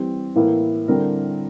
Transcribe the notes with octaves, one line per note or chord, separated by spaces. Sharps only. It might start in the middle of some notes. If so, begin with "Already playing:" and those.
Already playing: E3 G3 C4 G4
A2 E3 A#3 E4
D3 G3 C4 E4 A#4